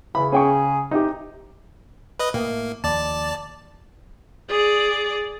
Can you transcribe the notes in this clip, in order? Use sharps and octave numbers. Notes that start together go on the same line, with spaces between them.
C#3 E3 B5
C#4 G#4 G5 C#6
C3 D#4 G4
B4 D#5 F#6
A2 A#3
D#2 F3 D5 A5
G#4 D5